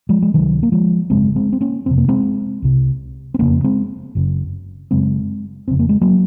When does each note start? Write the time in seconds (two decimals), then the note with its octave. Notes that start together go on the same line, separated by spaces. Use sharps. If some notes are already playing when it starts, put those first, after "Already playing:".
0.09 F3 G#3
0.22 G#3
0.34 C#2 C3 D#3 F#3
0.63 A#3
0.72 F3 G#3
1.10 G#1 F#2 C#3 G#3 C4
1.36 G#3 C4
1.53 C4
1.61 A#3 C#4
1.86 F#1 F2 C3 C4
1.98 A#3
2.08 G#3 C4
2.62 C2 C3
3.34 C4
3.39 F#1 F2 C#3 A#3 C#4
3.64 G#3 C4
4.15 F#1 F#2 C#3
4.91 F#1 F#2 C#3 G#3 C4
5.67 F#1 F2 C#3 C4
5.79 A#3
5.89 G#3
6.01 F#3 A#3